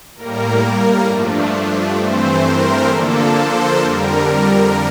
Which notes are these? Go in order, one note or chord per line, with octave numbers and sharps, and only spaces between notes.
A2 G3 A#3 A#4
G2 F3 A3 D4
G2 E3 A3 C4 C5
A#4
D3 F3 A#3 D4 A4
C5
F2 D3 G3 A#4